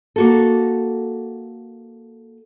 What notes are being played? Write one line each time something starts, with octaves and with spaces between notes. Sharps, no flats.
A#3 F#4 A4